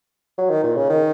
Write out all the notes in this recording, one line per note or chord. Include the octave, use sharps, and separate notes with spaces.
F#3
D#3
A#2
C#3
D#3